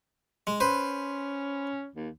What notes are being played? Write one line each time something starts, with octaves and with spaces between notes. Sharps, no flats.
G#3
C#4 B4 C5
D#2